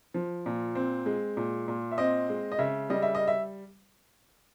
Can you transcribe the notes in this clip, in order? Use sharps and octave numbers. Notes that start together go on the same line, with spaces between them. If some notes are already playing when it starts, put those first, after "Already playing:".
F3
A#2
C4
G#3
A#2
A#2
E5
C4 D#5
G#3
D#5
C#3 E5
G3 D#5
E5
D#5
E5